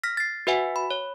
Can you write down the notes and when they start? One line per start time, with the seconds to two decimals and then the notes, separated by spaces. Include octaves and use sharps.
0.04 F6 A#6 B6
0.17 A6 C7
0.47 F#4 B4 E5 F#5 G#5
0.76 B5
0.90 C#5